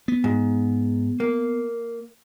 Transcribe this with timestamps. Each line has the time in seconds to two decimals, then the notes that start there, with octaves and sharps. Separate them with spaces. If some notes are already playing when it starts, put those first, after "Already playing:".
0.08 B3
0.24 G#2
1.20 A#3